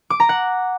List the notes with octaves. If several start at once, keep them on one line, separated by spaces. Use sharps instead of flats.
D6
A#5
F#5